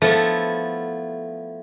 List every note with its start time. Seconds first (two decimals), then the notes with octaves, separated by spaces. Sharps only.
0.02 F3 A3 B3 E4